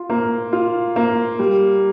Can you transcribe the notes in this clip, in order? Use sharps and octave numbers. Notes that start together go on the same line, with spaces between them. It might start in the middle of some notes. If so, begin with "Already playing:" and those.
Already playing: F4
A#3
F4
A#3
G3